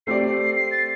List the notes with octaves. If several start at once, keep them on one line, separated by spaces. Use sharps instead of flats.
A3 C4 G4 D5 C7
C7
C7
C7
A6